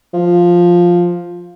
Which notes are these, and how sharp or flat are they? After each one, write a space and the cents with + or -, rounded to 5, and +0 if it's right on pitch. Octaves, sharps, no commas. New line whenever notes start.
F3 +5